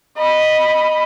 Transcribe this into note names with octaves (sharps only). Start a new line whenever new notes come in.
D#5 B5